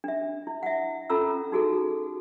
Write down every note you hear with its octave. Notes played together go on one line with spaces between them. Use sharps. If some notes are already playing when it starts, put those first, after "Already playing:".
D4 E5
E4
E5 F#5
C#4 F4 A4 A#5 E6
D#4 F#4 G#4 A4